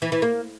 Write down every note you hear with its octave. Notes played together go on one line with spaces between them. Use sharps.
E3
E3
A#3